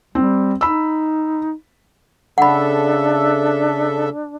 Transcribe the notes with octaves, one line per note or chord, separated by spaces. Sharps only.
G3 C4
D#4 B5 E6
C#3 D4 A4 E5 F#5 B5